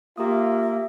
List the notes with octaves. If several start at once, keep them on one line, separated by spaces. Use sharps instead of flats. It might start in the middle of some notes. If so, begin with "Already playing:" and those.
A#3 F4 G4 E5 D#6